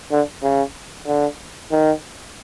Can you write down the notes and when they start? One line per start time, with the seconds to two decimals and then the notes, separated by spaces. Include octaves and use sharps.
0.12 D3
0.43 C#3
1.07 D3
1.71 D#3